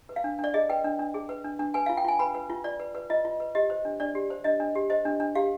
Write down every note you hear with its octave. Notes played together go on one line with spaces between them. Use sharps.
B4
F5
D4
D4
D5
G#4 D#5
B4 G5
D4
D4
G#4
B4
D4
D4
B4 G#5
F4 F5
G5
F4 G#5
B4 B5
B4
F4
F4 D5
B4
B4
F4 D#5
F4
B4
G4 D#5
C5
D4
D4 D5
G4
C5
D4 D#5
D4
G4
C5 D#5
D4
D4
G4 F5